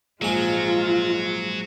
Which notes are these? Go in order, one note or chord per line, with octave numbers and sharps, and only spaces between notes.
A#1 G#2 F#3 G#3 F4 G#5